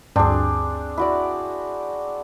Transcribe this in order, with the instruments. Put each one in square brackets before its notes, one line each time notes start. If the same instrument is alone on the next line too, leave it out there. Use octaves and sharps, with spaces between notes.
[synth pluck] D2 G2 [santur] C4 G#4 [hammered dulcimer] D4
[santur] E4 F#4 D5